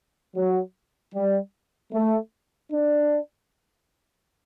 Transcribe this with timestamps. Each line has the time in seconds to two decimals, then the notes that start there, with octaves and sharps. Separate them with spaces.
0.36 F#3
1.14 G3
1.93 A3
2.71 D4